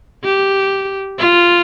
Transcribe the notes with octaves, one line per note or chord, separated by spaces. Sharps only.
G4
F4